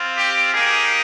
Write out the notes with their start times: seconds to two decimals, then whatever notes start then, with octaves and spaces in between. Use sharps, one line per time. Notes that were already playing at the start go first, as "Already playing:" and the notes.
Already playing: C4 F4
0.17 G4
0.53 A#3 D#4 G4 G#4